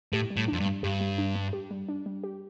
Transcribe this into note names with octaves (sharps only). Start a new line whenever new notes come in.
A2 G4
G3
A2
D4
F2
G2
G3
G2 G4
G3
D4
G3
G4
G3
D4
G3
G4